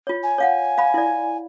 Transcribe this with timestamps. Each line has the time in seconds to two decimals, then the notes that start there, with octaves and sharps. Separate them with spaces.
0.07 F4 C#5
0.23 G#5
0.38 C#5 F5 F#5
0.78 F5 B5
0.94 E4 D5